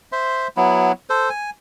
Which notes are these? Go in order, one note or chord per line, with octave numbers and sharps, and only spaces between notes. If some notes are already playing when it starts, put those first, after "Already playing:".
C5 E5 C6
F#3 B3 E4
A4 C5
G#5